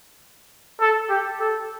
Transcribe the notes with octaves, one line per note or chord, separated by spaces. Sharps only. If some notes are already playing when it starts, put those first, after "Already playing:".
A4
G4
A4